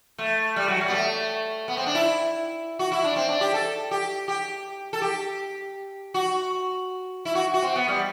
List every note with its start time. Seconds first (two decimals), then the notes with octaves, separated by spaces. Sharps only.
0.18 A3
0.56 G3
0.68 F#3
0.81 G3
0.88 B3
0.93 A3
1.68 B3
1.77 C4
1.86 D4
1.95 E4
2.79 F#4
2.92 E4
3.04 D4
3.16 C4
3.29 D4
3.41 G4
3.54 A4
3.91 G4
4.28 G4
4.93 A4
5.02 G4
6.14 F#4
7.25 E4
7.35 F#4
7.54 F#4
7.62 C4
7.76 B3
7.88 G3